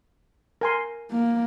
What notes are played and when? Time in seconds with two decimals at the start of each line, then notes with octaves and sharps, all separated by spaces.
0.61 A#4 G#5 C6
1.11 A#3